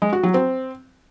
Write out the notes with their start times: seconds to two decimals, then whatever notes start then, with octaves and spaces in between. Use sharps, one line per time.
0.02 G#3
0.13 F#4
0.23 F#3
0.34 C4